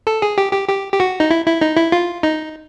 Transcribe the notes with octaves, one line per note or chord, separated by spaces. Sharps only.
A4
G#4
G4
G4
G4
G4
F#4
D#4
E4
E4
D#4
E4
F4
D#4